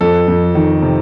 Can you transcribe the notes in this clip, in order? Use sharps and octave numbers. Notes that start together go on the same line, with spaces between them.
F2 A4
F2
D#3
C3